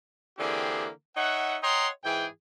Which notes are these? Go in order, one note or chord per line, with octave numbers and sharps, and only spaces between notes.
D3 E3 A#3 C4 G4 G#4
D#4 C#5 E5 F#5
C#5 D#5 F#5 G5 A#5 C6
G#2 E3 G#4 G5